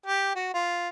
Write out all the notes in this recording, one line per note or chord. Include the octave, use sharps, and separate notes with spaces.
G4
F#4
F4